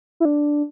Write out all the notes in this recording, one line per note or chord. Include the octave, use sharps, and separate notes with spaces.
E4
D4